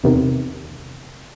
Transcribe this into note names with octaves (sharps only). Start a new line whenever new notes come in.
E2 C3 D#3